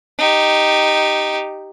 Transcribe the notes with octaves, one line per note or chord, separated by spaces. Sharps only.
D#4 G4